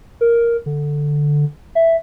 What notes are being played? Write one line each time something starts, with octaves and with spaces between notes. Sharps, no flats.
A#4
D3
E5